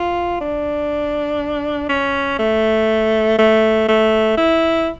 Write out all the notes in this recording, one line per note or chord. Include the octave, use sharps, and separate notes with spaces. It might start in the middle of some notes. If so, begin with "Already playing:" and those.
Already playing: F4
D4
C#4
A3
A3
A3
E4